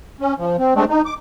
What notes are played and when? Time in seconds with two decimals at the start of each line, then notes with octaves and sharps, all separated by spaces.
0.20 C#4
0.39 F3
0.59 C4
0.75 G#3 A3 C4 D4
0.89 D#4
1.05 D6